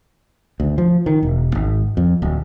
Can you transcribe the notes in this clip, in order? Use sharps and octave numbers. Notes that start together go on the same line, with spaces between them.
D2
F3
D#3
E1
G#1
F2
D1